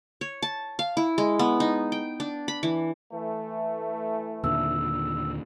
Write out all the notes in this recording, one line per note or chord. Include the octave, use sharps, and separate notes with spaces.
C#5
A5
F5
E4
G#3
B3
D#4
G5
D4
B5
E3
E3 A3
D#2 A#2 D3 E6